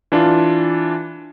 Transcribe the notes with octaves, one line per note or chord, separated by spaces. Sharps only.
E3 D4 F4